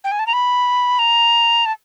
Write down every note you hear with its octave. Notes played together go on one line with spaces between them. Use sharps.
G5
G#5
A5
A#5
B5
A#5
A5